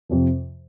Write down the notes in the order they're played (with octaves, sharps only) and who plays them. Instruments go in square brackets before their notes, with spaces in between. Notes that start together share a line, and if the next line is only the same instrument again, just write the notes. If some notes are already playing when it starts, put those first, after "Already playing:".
[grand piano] F2 C3 F3